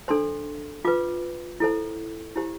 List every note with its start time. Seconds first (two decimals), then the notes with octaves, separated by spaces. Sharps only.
0.08 D4 A4 C5 C6
0.85 F4 B4 D6
1.60 E4 A4 C5
2.35 E4 G4 C5